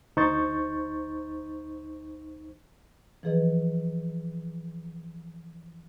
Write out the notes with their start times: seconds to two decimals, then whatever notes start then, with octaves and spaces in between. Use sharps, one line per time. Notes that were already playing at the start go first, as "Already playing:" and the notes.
0.17 D2 D#4 C5 C#6 G6 A6
3.23 E3 F3 G#4 B4 D#5